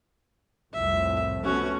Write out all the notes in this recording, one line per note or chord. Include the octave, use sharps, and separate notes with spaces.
C2 F2 A2 E5
A3 B3 C#4 F#4